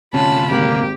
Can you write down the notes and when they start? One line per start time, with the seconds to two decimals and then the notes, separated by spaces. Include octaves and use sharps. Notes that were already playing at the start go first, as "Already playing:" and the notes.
0.14 D2 C3 C#4 F4 A5 B5
0.51 G#1 A#3 G4